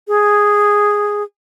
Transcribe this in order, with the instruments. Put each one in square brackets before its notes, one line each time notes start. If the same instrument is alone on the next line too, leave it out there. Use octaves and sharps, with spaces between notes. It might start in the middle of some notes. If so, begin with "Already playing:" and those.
[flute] G#4